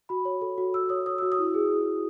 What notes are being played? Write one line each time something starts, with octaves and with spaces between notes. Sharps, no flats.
F#4 B5
C#5
A4
F#4
F#4 E6
C#5 D#6
C#5 D#6
F#4 E6
D#6
E4
G#4